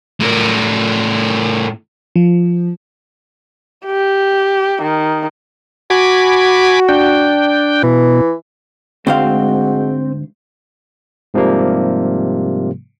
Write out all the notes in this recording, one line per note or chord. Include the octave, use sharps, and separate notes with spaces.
A2 A#4
F3
G4
D#3
F#4 G#5 B5 D6
D4 G5
B2 E3
D2 G#2 G#3 C4 F#4 F5 G5
G#2 C3 F3 G3 A#3